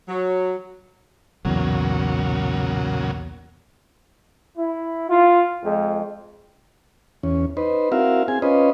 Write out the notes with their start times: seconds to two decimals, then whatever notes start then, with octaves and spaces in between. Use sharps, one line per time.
0.08 F#3
1.45 B1 E2 A#2 C#3 F#3
4.57 E4
5.10 F4
5.64 F2 G#3
7.23 E2 C#4
7.57 D#4 B4 C5
7.92 C4 E4 F#4 A#4 E5 F5
8.28 C4 G#4 G#5
8.42 C#4 F4 B4 C5 D#5